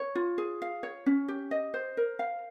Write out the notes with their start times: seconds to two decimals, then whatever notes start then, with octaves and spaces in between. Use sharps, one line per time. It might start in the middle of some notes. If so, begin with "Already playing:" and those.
Already playing: C#5
0.15 F4
0.38 G#4
0.62 F5
0.83 C#5
1.06 C#4
1.28 G4
1.51 D#5
1.74 C5
1.97 A#4
2.19 F5